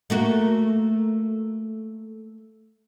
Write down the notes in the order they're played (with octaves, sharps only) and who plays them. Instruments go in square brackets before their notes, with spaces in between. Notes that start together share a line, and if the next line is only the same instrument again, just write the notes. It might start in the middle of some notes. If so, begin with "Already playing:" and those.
[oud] A3 A#3 F#4